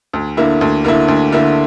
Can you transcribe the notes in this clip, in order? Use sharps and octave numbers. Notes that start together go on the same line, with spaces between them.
D2
D3 A#3 E4
D2
D3 A#3 E4
D2
D3 A#3 E4